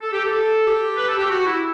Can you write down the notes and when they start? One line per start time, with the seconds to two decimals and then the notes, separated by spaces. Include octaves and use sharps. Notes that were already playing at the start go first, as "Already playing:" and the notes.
0.01 A4
0.12 G4
0.24 A4
0.65 G4
0.96 B4
1.08 A4
1.18 G4
1.29 F#4
1.45 E4